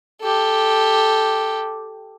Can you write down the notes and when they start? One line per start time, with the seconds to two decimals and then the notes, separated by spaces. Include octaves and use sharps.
0.22 G4 A4